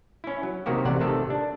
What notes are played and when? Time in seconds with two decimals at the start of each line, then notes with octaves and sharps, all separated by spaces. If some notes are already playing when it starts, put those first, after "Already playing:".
0.24 C#4 E4
0.43 F#3
0.66 C3 D#3 A#3 F#4 G4
0.85 A1 C3 D5 F#5
1.00 C3 D#3 A3 A4
1.30 D4